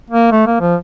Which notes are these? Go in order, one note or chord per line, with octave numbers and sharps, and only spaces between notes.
A#3
A3
A#3
F3